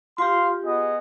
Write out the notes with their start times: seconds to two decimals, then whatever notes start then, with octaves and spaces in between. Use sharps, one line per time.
0.18 F4 G4 F5 C6
0.64 B3 G#4 D#5